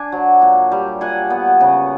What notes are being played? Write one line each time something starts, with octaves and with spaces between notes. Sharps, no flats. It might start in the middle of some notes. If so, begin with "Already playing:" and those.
Already playing: D4 G#5
F#3
A#2
G3
A#2 F#5 G#5
B3
C#3